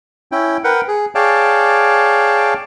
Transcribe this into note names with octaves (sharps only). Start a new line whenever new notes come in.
C#4 E4 G5
A#4 B4 F#5 G5
G#4
G#4 C#5 D5 F5 G5 A5